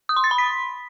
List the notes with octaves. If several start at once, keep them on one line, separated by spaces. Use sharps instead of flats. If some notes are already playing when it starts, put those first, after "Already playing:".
D#6
C6
A6
B5
B6